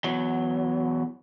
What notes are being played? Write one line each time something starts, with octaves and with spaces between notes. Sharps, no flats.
E2 F#3